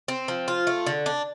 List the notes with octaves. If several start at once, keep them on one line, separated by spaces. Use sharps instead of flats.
C4
F3
F4
A3
D3
D4